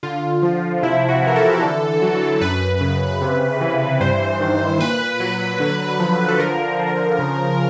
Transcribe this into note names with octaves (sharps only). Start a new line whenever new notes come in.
D3 F4
F3
C3 E4
F#4
E3 A#4
A4
D3
F#3
F#2 B4
C#3
C3
E3
G2 C5
D#3
A#2 B4
F#3
D3
F3
A4
D3 A#4
F3
C#3